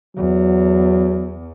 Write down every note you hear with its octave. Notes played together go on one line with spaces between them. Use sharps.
E2 F#3